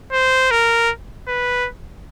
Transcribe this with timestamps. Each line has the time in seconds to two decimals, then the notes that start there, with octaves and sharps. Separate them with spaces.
0.12 C5
0.51 A#4
1.28 B4